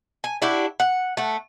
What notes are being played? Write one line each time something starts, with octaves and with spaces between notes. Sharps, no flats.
G#5
D4 E4 F#4 G4
F#5
A3 F#5